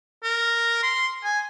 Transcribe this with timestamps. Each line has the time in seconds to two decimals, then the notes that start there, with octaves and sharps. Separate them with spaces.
0.24 A#4
0.83 C6
1.24 G#5